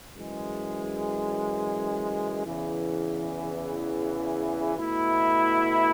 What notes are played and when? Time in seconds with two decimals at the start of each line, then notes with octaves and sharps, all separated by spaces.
0.15 F#2 E3 G#3
2.45 E2 C#3 E3
4.76 B2 A3 E4